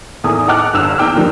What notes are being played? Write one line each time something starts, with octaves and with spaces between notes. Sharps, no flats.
E2 A2 D#3 G#5 D#6
D#5 F#5 A5 D6 F6 F#6
G1 G2 E6 F7
E2 D#4 G5 D6 F6
D#3 F3 G3 D4 D#4